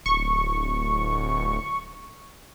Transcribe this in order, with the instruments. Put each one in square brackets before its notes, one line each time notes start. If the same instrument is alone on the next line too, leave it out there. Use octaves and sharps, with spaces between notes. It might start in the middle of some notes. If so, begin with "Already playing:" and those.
[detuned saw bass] D1 [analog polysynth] C#6